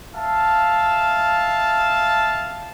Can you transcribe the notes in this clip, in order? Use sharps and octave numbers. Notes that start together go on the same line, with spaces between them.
E5 F5 A5